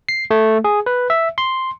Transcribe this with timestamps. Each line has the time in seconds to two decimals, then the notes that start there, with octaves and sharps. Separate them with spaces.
0.09 C7
0.31 A3
0.64 G#4
0.86 B4
1.10 E5
1.38 C6